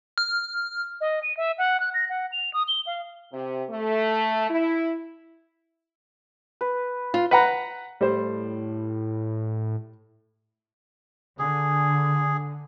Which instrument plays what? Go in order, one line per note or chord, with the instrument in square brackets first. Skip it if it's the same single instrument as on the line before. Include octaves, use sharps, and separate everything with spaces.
[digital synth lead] F6
[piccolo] D#5
D#7
E5
F#5
F#6
A#6
F#5
F7
D#6
G7
F5
[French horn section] C3
A3
E4
[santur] B4
[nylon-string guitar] F4
[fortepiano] B4 F#5 A#5
[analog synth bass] A2 [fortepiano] G3 C5
[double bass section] D3 [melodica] G#4